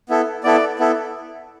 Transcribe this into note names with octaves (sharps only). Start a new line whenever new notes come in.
B3 E4 A4
B3 E4 A4 D5
B3 E4 A4